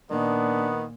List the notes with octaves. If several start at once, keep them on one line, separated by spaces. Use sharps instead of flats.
A#2 D#3 B3 D4